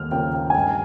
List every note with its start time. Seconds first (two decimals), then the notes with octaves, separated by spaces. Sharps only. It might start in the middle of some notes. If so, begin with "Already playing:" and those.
Already playing: D#2 F6
0.11 C#3 F3 A#3 G5
0.34 G5
0.50 G#5
0.55 G2 G5